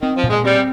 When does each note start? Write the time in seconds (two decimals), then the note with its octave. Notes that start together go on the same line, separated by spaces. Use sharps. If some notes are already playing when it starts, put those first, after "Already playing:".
0.02 D#3 C4
0.16 F3
0.23 A#2
0.30 G#3
0.44 G3 C4